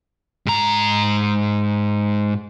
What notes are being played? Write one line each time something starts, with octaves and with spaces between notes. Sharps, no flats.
G#2 A#5